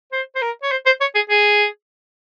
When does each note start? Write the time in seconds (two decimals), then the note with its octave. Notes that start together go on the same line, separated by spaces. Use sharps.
0.12 C5
0.35 C5
0.42 A#4
0.63 C#5
0.72 C5
0.86 C5
1.01 C#5
1.15 G#4
1.30 G#4